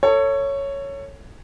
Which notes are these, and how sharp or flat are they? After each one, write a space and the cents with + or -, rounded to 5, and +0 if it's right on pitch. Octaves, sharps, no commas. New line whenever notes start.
A4 +30 C#5 +0